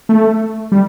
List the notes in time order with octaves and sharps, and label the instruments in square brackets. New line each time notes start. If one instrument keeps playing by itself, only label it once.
[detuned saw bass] A3
G3